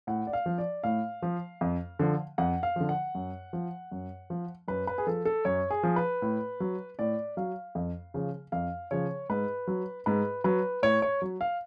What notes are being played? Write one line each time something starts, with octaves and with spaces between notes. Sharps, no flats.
A2 F#5
D5
F5
F3
D5
A2 F5
F3
F2
D3 F3
F2 F#5
F5
D3 F3
F#5
F#2
F3
F#2
F3
F#2 B4
B4
G#4
F3 A4
A4
F#2 C#5
G#4
F3
B4
A2
F#3
A2 D5
F#3 F5
F2
C#3 F3
F2 F5
C#3 F3 C#5
G#2 B4
F#3
G#2 B4
F#3 B4
A2 C#5
C#5
F#3
F5